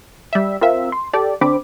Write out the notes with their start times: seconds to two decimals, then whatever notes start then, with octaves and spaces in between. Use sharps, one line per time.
0.33 G3 E5
0.61 C4 F4 A#4 E5 F5
0.92 C6
1.13 G4 A4 D5
1.41 D3 C4 D4 B5 D6